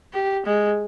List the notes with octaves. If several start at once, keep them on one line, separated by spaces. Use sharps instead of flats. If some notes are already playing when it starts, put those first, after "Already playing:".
G4
G#3